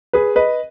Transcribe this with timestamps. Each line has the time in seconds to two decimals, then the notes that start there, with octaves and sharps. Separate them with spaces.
0.13 G#4 B4
0.36 B4 D#5